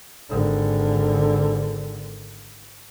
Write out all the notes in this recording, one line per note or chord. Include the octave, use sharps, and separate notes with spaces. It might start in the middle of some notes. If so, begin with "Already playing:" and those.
G#1 D3